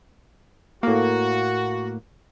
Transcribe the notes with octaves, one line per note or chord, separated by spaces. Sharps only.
A2 A#3 F#4